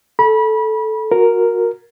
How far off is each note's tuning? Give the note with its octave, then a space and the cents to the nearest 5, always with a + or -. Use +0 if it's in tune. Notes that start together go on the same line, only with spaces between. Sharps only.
A4 -10 B5 -30
F#4 -25 A#4 +0